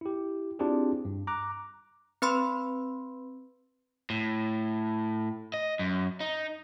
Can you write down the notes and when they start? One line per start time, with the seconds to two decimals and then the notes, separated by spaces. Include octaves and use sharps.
0.01 E4 G4
0.59 C4 D4 E4 F4 G4 G#4
1.05 G2
1.27 A#5 D6 F#6
2.22 C4 B4 B5 C6 E6
4.10 A2
5.54 D#5
5.79 F#2
6.20 D#4